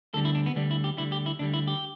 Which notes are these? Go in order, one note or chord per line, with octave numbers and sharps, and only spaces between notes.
D2 D3 G3 A4
E4
D4
B3
D2 D3 G3 D4
E4
G4
D2 D3 G3 E4
G4
E4
D2 D3 G3 D4
E4
G4